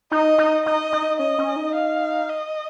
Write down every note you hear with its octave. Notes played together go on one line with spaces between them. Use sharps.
D#4 D#5
D#4
D#4 D#5
D#4
C#4 D#5
C#4
D#4
F5
D#5